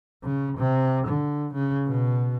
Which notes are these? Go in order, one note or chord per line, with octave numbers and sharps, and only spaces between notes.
C#3
C3
D3
C#3
B2